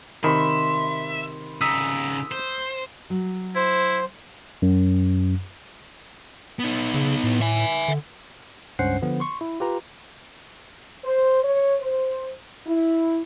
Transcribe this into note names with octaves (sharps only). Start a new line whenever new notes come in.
C3 D#3 E5 B5 C6
C#3 D#4 D#6 E6 B6
C5
F#3
E4 C5
F#2
B3 D#4
C#3
A2
E5 G#5
D3
C#2 G2 C#4 C5 F#5 C7
D3 F3 B3
C6 C#6
E4
F4 G4 B4 A#5
C5
C#5
C5
E4